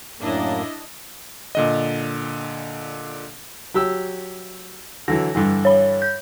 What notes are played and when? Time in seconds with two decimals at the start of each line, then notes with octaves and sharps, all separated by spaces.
0.20 F#2 A2 A#3 D4 E4 D#5
1.55 A#2 D3 D#5
3.74 F#3 G4 E6
5.08 D3 E3 F#3 A#6
5.35 G2 D3 E3
5.65 C#5 B5
6.02 G6